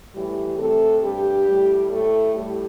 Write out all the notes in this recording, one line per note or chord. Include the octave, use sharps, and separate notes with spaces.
A2 E3 G3 G4
C3 A3 A4
G2 G3 G4
A2 G3
A2 A3 A4
A2 G3 G4